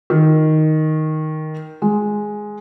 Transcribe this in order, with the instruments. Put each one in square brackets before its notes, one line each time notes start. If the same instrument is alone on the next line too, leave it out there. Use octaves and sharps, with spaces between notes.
[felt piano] D#3
G#3